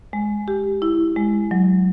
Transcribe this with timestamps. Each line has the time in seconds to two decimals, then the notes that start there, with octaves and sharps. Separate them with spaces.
0.13 G#3
0.48 G4
0.82 E4
1.16 G#3
1.51 F#3